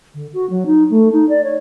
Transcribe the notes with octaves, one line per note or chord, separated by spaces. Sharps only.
D3
F#4
F#3
D#4
A3
D#4
D5
C#5